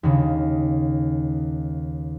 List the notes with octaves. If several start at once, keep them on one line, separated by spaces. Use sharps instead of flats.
D#2 C#3